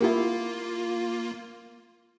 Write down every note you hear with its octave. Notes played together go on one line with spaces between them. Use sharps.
A#3 E4 F4 G4 A#4